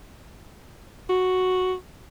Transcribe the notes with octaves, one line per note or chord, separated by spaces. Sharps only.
F#4